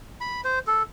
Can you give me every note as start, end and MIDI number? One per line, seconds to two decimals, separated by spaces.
0.21 0.41 83
0.44 0.59 72
0.67 0.83 69